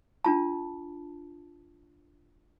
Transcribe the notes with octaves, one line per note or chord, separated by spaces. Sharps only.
D4 F4 A5